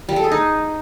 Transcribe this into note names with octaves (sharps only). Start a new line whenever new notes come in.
G3
A4
G#4
D#4